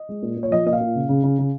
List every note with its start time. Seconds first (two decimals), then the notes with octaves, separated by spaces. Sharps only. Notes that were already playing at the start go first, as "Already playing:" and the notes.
Already playing: D#5
0.09 G#3
0.22 A#2
0.36 A#2
0.43 C#5
0.51 F3 D#5
0.66 A#2 D#5
0.73 F5
0.80 A#2
0.95 C#3
1.09 C#3
1.23 C#3
1.39 C#3